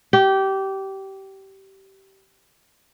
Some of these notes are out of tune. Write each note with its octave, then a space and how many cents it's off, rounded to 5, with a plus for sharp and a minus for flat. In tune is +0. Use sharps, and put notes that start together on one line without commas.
G4 -20